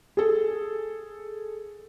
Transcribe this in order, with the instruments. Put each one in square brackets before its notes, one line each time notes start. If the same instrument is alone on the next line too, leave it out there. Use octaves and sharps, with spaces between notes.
[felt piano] G#4 A4